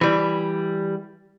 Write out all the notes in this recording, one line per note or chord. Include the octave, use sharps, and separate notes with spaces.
E3 G3